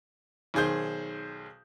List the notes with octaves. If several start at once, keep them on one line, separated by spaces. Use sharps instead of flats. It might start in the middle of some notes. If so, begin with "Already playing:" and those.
B1 D#3 G#4 C5 G6